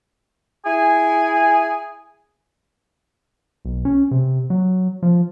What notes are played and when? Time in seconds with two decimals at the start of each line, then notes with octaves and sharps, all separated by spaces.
0.65 E4 G#4 G#5
3.65 B1
3.85 C#4
4.11 C3
4.50 F#3
5.03 F3